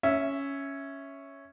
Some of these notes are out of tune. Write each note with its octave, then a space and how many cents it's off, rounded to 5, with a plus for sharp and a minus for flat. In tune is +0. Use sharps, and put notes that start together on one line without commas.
C#4 +0 E5 +0